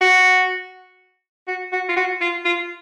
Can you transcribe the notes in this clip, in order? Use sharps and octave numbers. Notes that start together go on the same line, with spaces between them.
F#4
F#4
F#4
F4
F#4
F4
F4